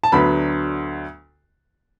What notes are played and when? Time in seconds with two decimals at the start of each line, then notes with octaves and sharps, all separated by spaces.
0.04 A5
0.12 D2 D3 F#3 B3 B5